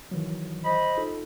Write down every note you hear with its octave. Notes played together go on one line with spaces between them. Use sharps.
D#3 E3 F#3
C5 D#5 B5
D#4 F4 A4